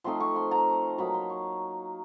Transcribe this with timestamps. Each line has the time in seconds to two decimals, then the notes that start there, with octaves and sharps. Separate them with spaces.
0.04 F3 A3 C4 D#4 C6
0.20 C#6
0.36 C6
0.51 A#5
0.98 F#3 A#3 D#4 B5
1.14 C6
1.29 C#6